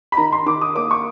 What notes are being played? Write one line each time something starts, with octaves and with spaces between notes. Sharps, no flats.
B5
D#3 A#5
C6
D#3 D6
D#6
A#3 D6
C#6